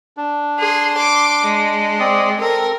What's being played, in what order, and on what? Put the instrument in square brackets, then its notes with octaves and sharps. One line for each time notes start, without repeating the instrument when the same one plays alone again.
[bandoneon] D4
[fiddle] G#4 C6
C6 D6
G#3
[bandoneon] C4 D5 D#6
[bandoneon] C4 A4 [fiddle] A#4